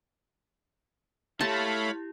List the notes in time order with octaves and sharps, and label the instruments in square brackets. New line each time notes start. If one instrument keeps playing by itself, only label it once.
[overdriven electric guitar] A3 [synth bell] E4 G4 [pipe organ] C#5 F5 B5 [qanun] A5